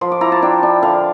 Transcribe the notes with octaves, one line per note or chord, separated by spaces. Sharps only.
F3 C6
D6
E4 A#5
A5
D4 G5
D4
D3 F5